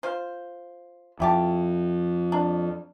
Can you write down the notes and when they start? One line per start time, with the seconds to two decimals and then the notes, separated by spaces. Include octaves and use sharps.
0.03 F4 C5
1.20 F2 E4 G4 A5
2.32 D4